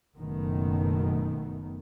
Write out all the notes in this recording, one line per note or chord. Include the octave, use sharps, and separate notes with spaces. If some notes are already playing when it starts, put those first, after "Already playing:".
F#1 F#2 B2 D#3 A3 B3